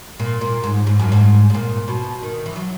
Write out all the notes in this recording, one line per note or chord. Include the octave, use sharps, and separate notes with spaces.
A#2
A#2
G#2
G#2
F#2
G#2
G#2
A#2
B2
D#3
E3
F#3